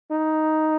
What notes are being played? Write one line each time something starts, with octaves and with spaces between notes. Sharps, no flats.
D#4